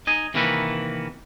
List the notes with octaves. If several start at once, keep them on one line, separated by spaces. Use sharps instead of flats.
D#4 D#5 G#5
C3 D#3 E3 A#3 F#4 B4